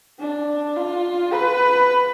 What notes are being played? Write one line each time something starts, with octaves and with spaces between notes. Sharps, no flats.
D4
F4
B4